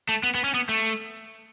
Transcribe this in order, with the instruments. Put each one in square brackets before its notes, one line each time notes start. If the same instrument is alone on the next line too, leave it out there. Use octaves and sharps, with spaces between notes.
[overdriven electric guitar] A3
B3
B3
C#4
B3
A3